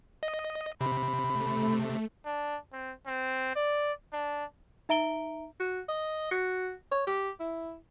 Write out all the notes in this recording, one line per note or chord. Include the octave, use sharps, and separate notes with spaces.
D#5
C3 B5
A3
D4
C4
C4
D5
D4
D#4 E5 A#5 D7 G7
F#4
D#5
F#4
C#5
G4
E4